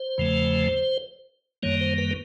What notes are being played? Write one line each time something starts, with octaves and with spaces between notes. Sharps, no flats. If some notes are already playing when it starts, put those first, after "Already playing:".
Already playing: C5
E2 C#3 F3 A3
F#2 D#3 G3 A#3 C#5
C5
B4